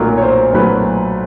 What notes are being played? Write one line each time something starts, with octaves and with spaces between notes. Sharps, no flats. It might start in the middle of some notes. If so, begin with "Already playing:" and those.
Already playing: B1 A#2 F#3 A3 A#4
C#5
C5
B1 A#2 F#3 A3 B4